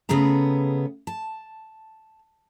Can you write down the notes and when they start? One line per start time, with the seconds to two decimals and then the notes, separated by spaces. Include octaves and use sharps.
0.09 C#3 A3 B3 G#4 A#5
1.07 A5